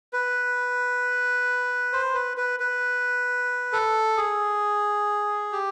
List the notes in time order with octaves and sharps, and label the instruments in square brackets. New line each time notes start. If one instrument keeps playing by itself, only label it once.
[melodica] B4
C5
B4
B4
B4
A4
G#4
G4